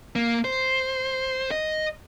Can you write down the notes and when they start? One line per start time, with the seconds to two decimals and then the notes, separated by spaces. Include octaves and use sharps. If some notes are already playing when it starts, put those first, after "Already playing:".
0.15 A#3
0.45 C5
1.51 D#5